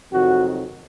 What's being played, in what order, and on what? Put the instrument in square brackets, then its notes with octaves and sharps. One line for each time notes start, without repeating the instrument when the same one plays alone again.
[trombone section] F2 C3 D#3 F#3 F#4